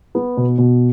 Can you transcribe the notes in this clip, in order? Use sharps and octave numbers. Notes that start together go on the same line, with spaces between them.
B3
B2
B2